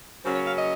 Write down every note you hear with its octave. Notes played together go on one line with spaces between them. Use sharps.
C#3 F#3 A#3 C#4 C5
C#5
F5
D#5